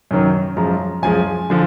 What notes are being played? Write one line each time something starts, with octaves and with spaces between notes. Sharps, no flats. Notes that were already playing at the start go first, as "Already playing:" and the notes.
F#2 D#3 F#3
F#2 F3 G#3 A#5
F#2 F3 G#3 G#5
D3 F3